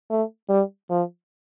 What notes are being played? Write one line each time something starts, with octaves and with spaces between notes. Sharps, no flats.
A3
G3
F3